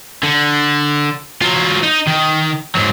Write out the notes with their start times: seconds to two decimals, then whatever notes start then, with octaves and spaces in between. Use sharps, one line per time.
0.23 D3
1.42 F#3 F4
1.83 D#4
2.08 D#3
2.75 G#2 F#3